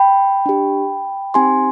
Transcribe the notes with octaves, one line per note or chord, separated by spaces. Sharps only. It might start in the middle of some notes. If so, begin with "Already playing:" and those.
Already playing: G5 B5
D4 G4
C4 D#4 G4 G#5 C6